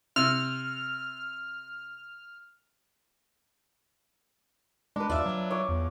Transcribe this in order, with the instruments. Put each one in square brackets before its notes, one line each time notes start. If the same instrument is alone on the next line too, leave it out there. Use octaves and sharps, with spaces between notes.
[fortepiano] C3 [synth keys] F6
[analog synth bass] G#3 [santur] D4 B4
[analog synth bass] D#2 [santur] F4 [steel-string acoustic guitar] D5 E5
[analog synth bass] F#3
[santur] C#5 D6
[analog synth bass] E2